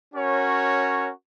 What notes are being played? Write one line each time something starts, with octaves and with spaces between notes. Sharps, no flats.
C#4 F#4 A#4 C#5